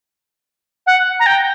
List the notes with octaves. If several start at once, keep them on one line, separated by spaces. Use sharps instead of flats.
F#5
A#5
G5